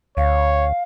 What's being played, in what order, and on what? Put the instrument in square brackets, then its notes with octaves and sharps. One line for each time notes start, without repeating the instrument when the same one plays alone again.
[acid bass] D2 [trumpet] C#5 [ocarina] F5